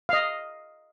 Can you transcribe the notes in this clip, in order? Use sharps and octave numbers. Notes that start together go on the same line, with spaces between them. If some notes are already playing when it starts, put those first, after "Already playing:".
D#5 F5